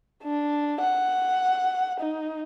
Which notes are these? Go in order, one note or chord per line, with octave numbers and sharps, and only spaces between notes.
D4
F#5
D#4